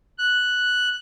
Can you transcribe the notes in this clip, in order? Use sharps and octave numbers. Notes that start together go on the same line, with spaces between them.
F#6